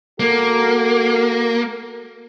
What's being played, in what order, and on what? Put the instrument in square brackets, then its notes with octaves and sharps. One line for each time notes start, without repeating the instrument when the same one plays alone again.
[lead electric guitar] A#3 [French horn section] F#4 A4 A#4